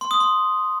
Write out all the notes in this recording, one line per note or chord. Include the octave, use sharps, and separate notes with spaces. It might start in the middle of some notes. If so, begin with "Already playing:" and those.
C6
D#6
C6